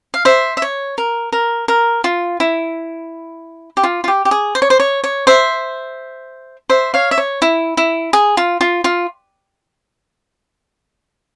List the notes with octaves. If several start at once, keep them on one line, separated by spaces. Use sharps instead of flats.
F5
C5 E5
E5
C#5
A#4
A#4
A#4
F4
E4
G4
F4
F4
G4
G4
G#4
C5
C#5
C5
C#5
C#5
C5 E5
C5 E5
C#5 F5
E5
C#5
E4
E4
G#4
F4
F4
F4